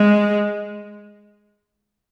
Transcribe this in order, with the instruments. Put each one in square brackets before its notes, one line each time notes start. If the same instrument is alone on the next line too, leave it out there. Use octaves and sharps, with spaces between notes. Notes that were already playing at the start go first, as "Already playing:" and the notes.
Already playing: [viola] G#3